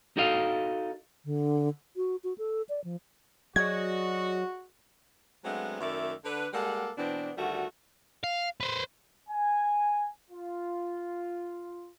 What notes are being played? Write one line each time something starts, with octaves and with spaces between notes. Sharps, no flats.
D#4 F#4 A4 D#5 F5
D3
F#4
F#4
A4
D5
F3
F#3 F#4 G#4 D5 D#5 G#6
F#3 G#3 A3 B3 C4 D4
F#2 D#3 A3 D5 E5
D3 B4
G3 G#3 A#3 A4 F#5
B2 E3 B3 C4 D4
D2 D#3 G3 A3 F#4
F5
B4 C5
G#5
F4